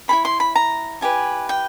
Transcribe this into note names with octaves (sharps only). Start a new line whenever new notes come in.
E4 G#4 C#5 B5
C6
B5
A#5
E4 G4 B4 G#5
G5